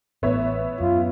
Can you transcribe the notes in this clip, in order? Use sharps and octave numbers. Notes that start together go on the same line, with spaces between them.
A1 A2 B3 C#5 E5
F#2 F4